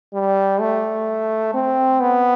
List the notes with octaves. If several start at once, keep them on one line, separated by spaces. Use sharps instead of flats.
G3
A3
C4
B3